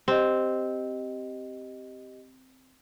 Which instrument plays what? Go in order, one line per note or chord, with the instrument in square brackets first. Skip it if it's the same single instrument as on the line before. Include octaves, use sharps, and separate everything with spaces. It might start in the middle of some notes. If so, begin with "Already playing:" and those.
[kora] C4 [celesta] G4 D#5